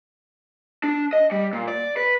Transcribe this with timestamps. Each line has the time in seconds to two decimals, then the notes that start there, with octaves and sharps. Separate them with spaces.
0.84 D4
1.13 D#5
1.31 G3
1.53 A#2
1.68 D5
1.97 B4